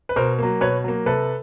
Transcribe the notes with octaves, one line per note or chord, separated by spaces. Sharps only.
B4
B2 A#4 C5
F#3 A#3
B2 B4 C#5
F#3 A#3
C3 A4 B4